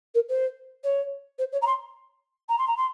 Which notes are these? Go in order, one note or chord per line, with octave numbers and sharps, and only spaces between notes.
A#4
C5
C#5
C5
C#5
A#5
C6
A#5
C6
A#5
C6